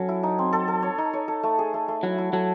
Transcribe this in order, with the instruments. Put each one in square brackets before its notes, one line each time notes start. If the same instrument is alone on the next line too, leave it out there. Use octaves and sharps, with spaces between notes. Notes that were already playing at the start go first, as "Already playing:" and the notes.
Already playing: [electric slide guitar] F#3 [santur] C#4 A4
[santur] E4
D#4
C4
A4
A4
C#5
D#4
C#5
A4
A3
G#4
A3
A3
[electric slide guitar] F#3 [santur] E4
[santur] E4
[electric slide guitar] F#3 [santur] A4